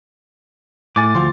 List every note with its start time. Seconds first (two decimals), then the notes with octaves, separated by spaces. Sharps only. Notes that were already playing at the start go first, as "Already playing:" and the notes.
0.96 A2 G#5 D6 A6
1.14 D2 F3 C6